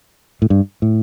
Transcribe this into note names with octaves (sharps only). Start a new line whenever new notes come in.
A2
G2
A2